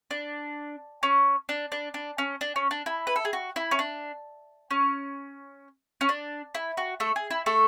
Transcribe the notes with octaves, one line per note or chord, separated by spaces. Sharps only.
D4
C#4
D4
D4
D4
C#4
D4
C#4
D4
E4
B4
A4
G#4
F#4
E4
C#4
D4
C#4
C#4
D4
E4
F#4
A3 A4
G#4
E4
A3 A4